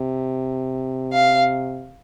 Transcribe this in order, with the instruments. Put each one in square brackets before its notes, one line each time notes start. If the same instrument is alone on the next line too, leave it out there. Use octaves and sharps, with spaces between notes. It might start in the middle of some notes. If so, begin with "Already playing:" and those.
Already playing: [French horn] C3
[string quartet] F5